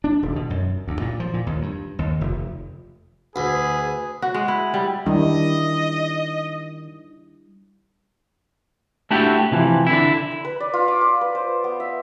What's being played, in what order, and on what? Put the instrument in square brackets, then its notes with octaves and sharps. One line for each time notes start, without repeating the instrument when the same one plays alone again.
[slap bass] D4
D#1
B2
F#2
D2
A#2
F3
A#2
D#2
G2
D#2
F1
[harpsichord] D2 [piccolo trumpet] G#4 [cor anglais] B4
[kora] F#4
G#3
E4
G3
[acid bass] D#3 [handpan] G3 D4 E4 [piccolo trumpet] D#5
[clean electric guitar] A3 D4 E4 F#4 G4
C3 E3 F3
D3 E4
[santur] B5
B4
D5
F4
D6
D6
B4
C5
B3
E5